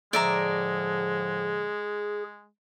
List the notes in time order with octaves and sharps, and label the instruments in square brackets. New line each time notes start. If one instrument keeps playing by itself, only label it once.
[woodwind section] A2 D3 F3 [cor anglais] G#3 [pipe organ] G#4 [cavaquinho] D5 E5 A#5